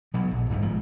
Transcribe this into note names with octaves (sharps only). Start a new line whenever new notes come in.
B2 F#3 B3
A#1
D1 G1 G2 B2
G#2 F3